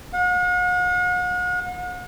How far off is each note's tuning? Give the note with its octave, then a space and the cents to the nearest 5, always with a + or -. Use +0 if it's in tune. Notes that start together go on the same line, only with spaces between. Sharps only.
F#5 -45